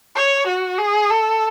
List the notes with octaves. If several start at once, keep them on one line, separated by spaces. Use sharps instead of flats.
C#5
F#4
G#4
A4